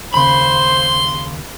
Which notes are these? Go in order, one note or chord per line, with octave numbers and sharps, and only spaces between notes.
D#2 C#3 C5 B5 C6